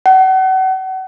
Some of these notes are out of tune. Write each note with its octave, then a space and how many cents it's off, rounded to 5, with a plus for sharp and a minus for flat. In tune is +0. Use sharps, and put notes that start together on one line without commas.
F#5 +35